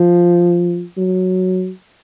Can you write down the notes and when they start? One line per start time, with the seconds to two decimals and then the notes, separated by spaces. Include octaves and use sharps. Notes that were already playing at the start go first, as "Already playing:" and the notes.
Already playing: F3
0.97 F#3